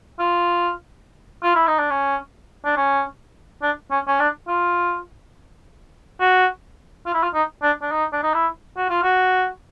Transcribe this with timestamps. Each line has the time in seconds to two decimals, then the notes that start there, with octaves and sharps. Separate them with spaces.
0.19 F4
1.43 F4
1.55 E4
1.67 D#4
1.79 D4
1.91 C#4
2.65 D4
2.77 C#4
3.62 D4
3.91 C#4
4.07 C#4
4.20 D4
4.48 F4
6.20 F#4
7.06 F4
7.14 E4
7.23 F4
7.34 D#4
7.63 D4
7.82 D4
7.91 D#4
8.13 D4
8.23 D#4
8.34 E4
8.77 F#4
8.90 F4
9.03 F#4